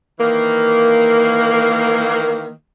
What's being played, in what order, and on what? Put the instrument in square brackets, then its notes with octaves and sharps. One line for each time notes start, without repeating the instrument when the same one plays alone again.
[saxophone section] D#3 E3 A#3